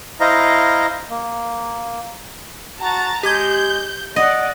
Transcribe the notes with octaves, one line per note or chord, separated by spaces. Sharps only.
E4 C5 D#5 F5 A#5
A#3
F#4 A5 A#5 A6
G#3 G4 D6 G6 G#6
D5 D#5 F#5